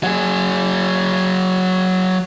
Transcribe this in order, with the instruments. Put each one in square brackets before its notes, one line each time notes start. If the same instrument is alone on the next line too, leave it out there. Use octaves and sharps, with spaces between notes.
[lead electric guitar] F#3 G#4